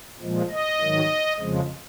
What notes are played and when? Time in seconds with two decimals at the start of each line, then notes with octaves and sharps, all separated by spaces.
0.20 A#2 F3 G#3
0.50 D#5
0.80 G#2 D#3 F#3
1.39 F2 C#3 F3 G#3